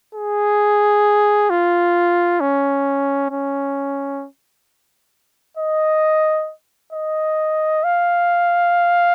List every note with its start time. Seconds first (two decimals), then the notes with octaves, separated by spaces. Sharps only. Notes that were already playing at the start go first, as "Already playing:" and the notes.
0.15 G#4
1.50 F4
2.41 C#4
3.31 C#4
5.57 D#5
6.93 D#5
7.84 F5